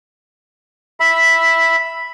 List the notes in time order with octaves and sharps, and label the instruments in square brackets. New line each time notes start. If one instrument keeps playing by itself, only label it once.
[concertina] E5 B5